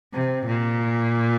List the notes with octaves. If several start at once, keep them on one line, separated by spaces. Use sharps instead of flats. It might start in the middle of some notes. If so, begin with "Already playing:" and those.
C3
A#2